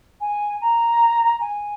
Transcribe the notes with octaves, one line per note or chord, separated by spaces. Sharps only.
G#5
A#5
G#5